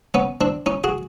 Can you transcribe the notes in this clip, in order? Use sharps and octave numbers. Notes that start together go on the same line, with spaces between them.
B3 C#4
C4 D4
C#4 D#4
F#4 G#4